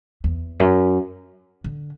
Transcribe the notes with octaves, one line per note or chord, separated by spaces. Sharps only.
E2
F#2
D3